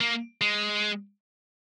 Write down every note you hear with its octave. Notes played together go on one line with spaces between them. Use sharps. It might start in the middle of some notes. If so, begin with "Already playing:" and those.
A#3
G#3